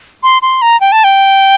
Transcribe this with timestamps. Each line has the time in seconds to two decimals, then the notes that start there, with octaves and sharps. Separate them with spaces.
0.23 C6
0.42 C6
0.62 A#5
0.81 G5
0.92 A5
1.04 G5